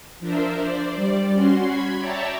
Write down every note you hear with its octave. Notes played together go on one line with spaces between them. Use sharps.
F3 D4 A#4 C5 E5
C5 D5
G3 D5
C#4 F#4 C6
B5 G#6
C#5 D5 E5 G5 A5 A#5